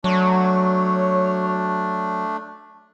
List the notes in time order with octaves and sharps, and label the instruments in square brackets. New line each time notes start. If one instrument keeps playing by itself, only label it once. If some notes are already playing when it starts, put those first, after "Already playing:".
[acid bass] F#3 [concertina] A3 D4 [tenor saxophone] C#5